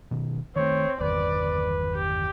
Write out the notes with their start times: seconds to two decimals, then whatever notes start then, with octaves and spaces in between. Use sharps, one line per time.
0.11 B2 D#3
0.56 D#3 A3 C4 C#5
1.00 G1 E2 D#3 B4 D5
1.94 G4